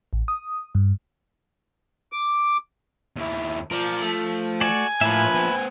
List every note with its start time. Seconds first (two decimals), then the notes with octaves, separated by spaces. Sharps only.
0.13 A1
0.28 D#6
0.75 G2
2.12 D6
3.16 D#2 E4
3.71 F3 A#4 D5
4.01 A3
4.61 F#4 A4 D5 G#5
5.01 A2 F3 A#3 B4 E5
5.35 B3 C5